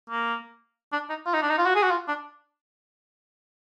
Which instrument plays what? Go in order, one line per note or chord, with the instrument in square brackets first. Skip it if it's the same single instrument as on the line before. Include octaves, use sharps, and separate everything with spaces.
[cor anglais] A#3
D4
D#4
F4
D#4
D4
D#4
F4
F#4
G#4
F#4
F4
D4